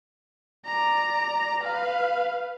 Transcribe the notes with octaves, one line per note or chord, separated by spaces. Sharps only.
D5 A#5
B4 F5